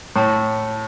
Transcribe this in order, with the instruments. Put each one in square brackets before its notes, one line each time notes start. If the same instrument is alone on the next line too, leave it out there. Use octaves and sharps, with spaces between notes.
[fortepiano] A2 [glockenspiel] A5